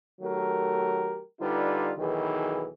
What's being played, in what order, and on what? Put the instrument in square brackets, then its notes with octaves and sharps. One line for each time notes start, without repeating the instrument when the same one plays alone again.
[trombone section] D#3 F#3 A3 G4 A#4
D3 G3 D#4 F4 B4
B1 D#3 E3 G#4